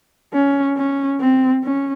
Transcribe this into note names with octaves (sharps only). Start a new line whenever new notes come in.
C#4
C#4
C4
C#4